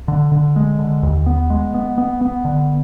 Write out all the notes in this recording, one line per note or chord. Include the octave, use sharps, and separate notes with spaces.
D3
D3
G#3
D3
D#2
B3
G#3
B3
B3
B3
D3